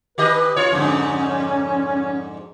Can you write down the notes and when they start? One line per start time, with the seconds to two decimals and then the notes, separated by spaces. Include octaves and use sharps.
0.18 D#3 G4 B4 D#5
0.56 F4 C#5
0.72 F2 G#2 D3 C#4